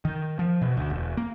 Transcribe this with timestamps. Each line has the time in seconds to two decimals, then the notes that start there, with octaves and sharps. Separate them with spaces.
0.05 D#3
0.39 F3
0.62 B2
0.77 D2
0.90 E1
1.17 A#3